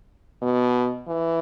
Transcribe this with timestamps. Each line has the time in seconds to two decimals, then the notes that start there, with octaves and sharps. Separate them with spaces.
0.42 B2
1.09 E3